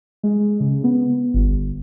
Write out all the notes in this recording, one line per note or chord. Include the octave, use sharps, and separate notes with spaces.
G#3
C#3
B3
G1